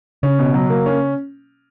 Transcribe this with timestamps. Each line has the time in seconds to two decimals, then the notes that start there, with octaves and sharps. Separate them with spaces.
0.23 C#3 C#4
0.39 B2
0.54 F#3
0.70 A#3
0.86 C#4